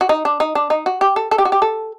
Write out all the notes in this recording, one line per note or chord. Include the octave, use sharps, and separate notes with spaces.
F#4
D#4
D4
D#4
D4
D#4
F#4
G4
A4
A4
G4
F#4
G4
A4